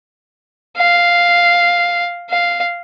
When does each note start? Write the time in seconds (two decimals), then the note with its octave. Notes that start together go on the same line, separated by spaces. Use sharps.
0.77 F5
2.30 F5